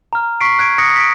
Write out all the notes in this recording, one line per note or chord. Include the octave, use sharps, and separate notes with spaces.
A#5 F6
C#6 B6 C7 D7
F#6 G#6 D7
D#6 F#6 A#6 C#7
B6 D7